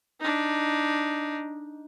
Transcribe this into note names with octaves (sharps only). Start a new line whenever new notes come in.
D4 D#4